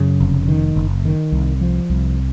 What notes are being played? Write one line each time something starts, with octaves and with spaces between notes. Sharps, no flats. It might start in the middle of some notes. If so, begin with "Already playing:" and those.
Already playing: F#2 C#3
F1
D#3
F#1
D#3
C2
F3
C2